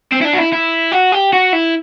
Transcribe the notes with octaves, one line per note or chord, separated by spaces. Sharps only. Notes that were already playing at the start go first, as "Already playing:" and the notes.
C4
E4
D4
F#4
E4
E4
F#4
G4
F#4
E4